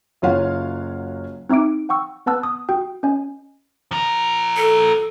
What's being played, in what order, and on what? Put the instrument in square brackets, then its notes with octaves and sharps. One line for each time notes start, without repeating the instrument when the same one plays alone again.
[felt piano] F#1 F#3 F4 C#5 F5 F#5
[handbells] C4 D#4 E5 D6 D7
F#5 G5 C#6 E6
B3 B4 F#5 A5 E6 F#6
D#6
F#4 G5 D#6
C#4 D#5 G#5
[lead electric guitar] F3 A#4
[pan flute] A4